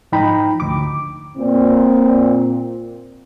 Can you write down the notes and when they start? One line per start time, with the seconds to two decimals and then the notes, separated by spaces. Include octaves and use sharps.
0.12 G#2 F3 D#4 G5 A#5 B5
0.60 D2 D6
1.38 A#2 C4